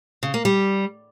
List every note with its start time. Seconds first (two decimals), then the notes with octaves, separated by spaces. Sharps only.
0.23 C#3
0.34 A#3
0.45 G3